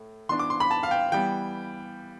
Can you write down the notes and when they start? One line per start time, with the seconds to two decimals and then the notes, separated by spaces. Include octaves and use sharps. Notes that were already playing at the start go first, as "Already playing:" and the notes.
Already playing: A2
0.29 E3 B3 D4 C6
0.39 D6
0.50 C6
0.60 B5
0.71 A5
0.83 F5
0.91 G5
1.12 E3 G3 B3 G5